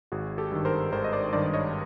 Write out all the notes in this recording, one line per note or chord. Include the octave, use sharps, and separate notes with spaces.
G#1 F#4 G#4
G4 A4
G2 D#3
A#4 C5
G#1 A#4 C5
D#5
C5 D5
G2 D#3 C5 D5
D5
C#5 D#5